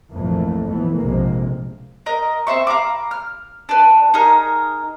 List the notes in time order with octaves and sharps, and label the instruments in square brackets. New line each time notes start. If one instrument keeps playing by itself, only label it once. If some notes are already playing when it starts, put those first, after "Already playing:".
[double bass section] A#1 F2 G#2 E3 A3 A#3
F2 E3 A3 B3
A#1 F2 C3 G#3 A#3
[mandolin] A#4 D#5
C4 C5 E5 C#6
F5 A#5 B5 D6
F6
D4 B4
D#4 G#4 A#4 F6